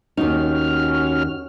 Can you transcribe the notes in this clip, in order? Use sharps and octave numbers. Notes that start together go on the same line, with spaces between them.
D#2 C#4 D#4 F#4 F6